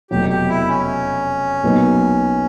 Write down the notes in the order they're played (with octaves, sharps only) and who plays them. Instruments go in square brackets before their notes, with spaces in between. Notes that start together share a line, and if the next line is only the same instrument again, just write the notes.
[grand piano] F1 E2 B2 F#3 [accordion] G4
[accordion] G4
E4
C#4
[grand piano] B1 A#2 F#3 B3 D#4